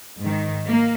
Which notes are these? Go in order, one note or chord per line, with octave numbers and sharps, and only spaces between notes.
G#2 D#3
A#3